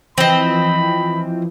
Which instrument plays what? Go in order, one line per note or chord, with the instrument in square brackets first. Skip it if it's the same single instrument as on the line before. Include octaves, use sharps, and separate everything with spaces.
[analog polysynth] E3 F3 [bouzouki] C4 D#5 [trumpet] B5